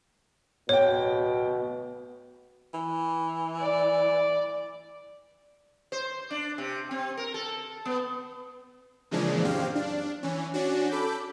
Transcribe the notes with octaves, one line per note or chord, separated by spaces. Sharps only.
D1 B2 C#5 G5
E3
D5
C5
D4
C3
C4
A#4
A4
B3
A#2 C#3 E3 F3 G#3 D4
F#2 C4 G4 F5
D4
E3 C#4
C#4 D4 F#4
A4 B5 D6 G6